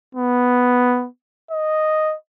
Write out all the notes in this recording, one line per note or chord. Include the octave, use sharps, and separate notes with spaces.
B3
D#5